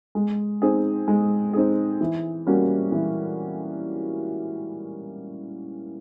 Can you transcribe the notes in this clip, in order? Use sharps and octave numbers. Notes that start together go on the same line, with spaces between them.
G#3
C4 D#4 G#4
G#3
C4 D#4 G#4
E3
G3 A#3 C#4 F#4
E3